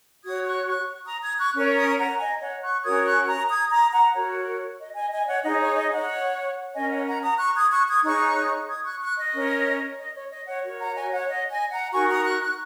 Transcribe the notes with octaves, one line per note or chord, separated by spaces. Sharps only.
F#4 C#5 D#6 G#6
C#6 F#6
C#6 F#6
A#5 D#6
D#6 G#6
C#6 F#6
C#4 A#4 C#5
A#5 D#6
F#5 A#5
D#5 G#5
C#5 F#5
C#6 F#6
C#4 F#4 A#4 C#5 D#6 G#6
C#6 F#6
A#5 D#6
D#6 G#6
A#5 D#6
F#5 A#5
F#4 A#4 C#5
D#5
D#5 G#5
D#5 G#5
D#5
C#5 F#5
D#4 G#4 C#5 D#5
C#5
D#5
C#5 F#5
C#4 A#4 C#5 D#5 G#5
C#5 F#5
F#5 A#5
A#5 D#6
C#6 F#6
D#6 G#6
C#6 F#6
D#6 G#6
D#4 G#4 C#5 C#6 F#6
D#6 G#6
C#6 F#6
C#6 F#6
D#5
C#4 A#4 C#5
D#5
C#5
D#5
C#5 F#5
F#4 A#4 C#5
F#5 A#5
D#5 G#5
C#5 F#5
D#5
D#5 G#5
F#5 A#5
D#4 F#4 A#4 G#5 C#6
A#5 D#6
C#6 F#6
C#6 F#6